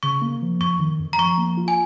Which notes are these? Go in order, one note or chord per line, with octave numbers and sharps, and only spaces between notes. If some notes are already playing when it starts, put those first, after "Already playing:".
C#3 C#6
A#3
F3
F2 C#6
D#3
F2
A#5
F3 C#6
A#3
F4
G#5